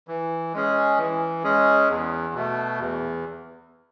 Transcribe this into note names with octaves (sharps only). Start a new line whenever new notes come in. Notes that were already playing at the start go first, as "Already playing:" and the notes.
E3
G#3 C#4 G#4
E3
G#3 C#4 G#4
E2
B2 A3
E2